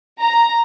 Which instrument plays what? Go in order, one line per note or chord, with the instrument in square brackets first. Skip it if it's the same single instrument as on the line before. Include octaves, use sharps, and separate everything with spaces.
[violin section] A#5